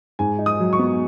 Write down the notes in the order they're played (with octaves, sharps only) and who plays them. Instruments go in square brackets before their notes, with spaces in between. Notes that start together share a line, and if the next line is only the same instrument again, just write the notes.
[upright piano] G#2 G#5
D#4
D#6
F#3
C#6
B3